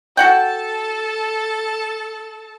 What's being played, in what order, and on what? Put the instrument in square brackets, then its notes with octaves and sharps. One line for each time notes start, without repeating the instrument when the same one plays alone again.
[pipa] F#4 F#5 G5 [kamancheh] A4 A5